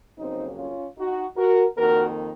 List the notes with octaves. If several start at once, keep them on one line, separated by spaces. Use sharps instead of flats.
F2 C#3 F#3 A#3 C4 D#4
C#4 F4
D#4 F#4
F#4 A#4
F2 D#3 A#3 F#4 A#4